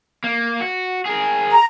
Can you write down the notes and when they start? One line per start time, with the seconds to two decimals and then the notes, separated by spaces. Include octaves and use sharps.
0.24 A#3
0.61 F#4
1.06 G#4 A#4
1.51 A#5